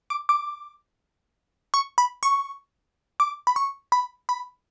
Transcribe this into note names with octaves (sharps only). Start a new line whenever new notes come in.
D6
D6
C#6
B5
C#6
D6
B5
C#6
B5
B5